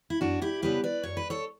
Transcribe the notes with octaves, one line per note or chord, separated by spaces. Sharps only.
E4
F#2 D4 F#4
E4 G4
C#3 G3 B3 G4 B4
B4 D5
F#2 C#5
B4
A4 C#5